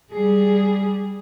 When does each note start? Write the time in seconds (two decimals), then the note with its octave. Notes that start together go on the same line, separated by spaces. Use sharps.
0.12 G3 G#4